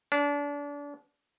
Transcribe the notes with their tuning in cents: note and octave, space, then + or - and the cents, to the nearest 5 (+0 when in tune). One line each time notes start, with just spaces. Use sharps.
D4 -30